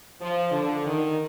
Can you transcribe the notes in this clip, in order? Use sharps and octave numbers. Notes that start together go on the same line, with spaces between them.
F3
D3
D#3